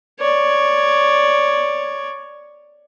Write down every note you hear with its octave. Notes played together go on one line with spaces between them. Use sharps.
C#5 D5